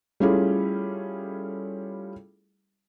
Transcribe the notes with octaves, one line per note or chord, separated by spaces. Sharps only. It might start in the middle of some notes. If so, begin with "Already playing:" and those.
G3 A3 C#4 E4 F4 G#4